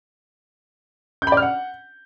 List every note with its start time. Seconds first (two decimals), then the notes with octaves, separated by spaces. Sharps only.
1.22 G6
1.27 B5
1.32 D5
1.37 F6
1.42 F#5